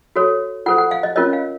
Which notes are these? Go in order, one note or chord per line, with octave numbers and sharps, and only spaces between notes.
F#4 A4 C#5
F4 A4 C5 F#5
F#5
F5
D#5
C#4 F4 A#4 C#5 D#5
F5